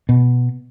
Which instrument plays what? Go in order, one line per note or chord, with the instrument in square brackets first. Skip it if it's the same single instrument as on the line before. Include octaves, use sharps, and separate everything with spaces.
[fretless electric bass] B2